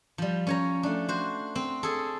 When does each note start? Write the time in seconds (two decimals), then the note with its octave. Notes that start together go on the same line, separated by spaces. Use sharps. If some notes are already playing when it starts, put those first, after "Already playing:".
0.18 F3 G3
0.47 C#4 C#5 A#5
0.83 A3 D4
1.08 F#4 C5
1.55 C4
1.83 G#4 A4